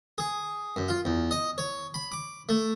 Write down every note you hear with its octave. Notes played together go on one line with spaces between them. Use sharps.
G#4
F#2
F4
E2
D#5
C#5
B5
D6
A3